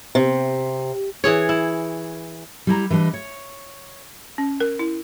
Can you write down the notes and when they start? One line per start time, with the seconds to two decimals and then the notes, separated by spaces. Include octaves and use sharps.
0.15 C3
1.24 E3 G#4 C#5
1.49 E4
2.67 G3 E4 A#5
2.90 E3 G3 D4 D#5
3.14 C#5
4.38 C#4
4.60 A#4
4.79 E4